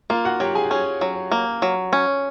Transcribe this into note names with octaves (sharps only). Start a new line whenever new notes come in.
A#3 F4 F5
F#4 F#5
F#3 G4 G5
G#4 G#5
G5
C#4 G#4 G#5
F#3
A#3
F#3
C#4